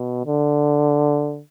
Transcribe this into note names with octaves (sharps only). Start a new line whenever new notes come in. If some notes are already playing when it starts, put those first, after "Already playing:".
Already playing: B2
D3